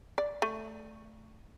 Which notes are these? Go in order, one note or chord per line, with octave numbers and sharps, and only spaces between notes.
D5
A3